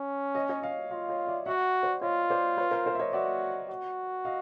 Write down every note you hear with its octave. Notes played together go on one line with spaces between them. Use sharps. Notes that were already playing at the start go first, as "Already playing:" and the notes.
Already playing: C#4
C#5 D#5
C#5 D#5
D#5 F5
F4 D#5 F5
C#5 D#5
D5 E5
F#4 E5 F#5
C5 D5
F4 C#5 D#5
C5 D5
B4 C#5
A#4 C5
A#4 C5
E5
C#5 D#5
F#4 D5 E5
F#4
D#5 F5